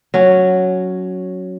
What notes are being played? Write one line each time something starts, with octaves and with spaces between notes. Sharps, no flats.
F#3 C#4